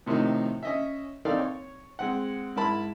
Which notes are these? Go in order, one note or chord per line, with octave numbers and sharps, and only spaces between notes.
A2 C3 D#3 F3 D#4
C#4 D#5 E5
C4 D#4 A4 A#4 D5 F5
C#5
G#3 C4 F#5
G#2 E4 A#4 A5 B5